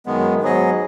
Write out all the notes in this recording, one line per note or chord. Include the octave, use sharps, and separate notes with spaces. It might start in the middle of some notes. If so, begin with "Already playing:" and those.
F#2 D#3 G#3 B3
G#2 F#3 B3 G#4 D#5